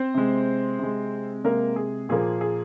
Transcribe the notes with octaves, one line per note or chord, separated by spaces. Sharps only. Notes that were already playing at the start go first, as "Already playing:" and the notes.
Already playing: C4 C5
C3 G#3
C3 G#3
C3 G#3 A#3 A#4
G#4
A#2 F3 A#3 G#4
G#4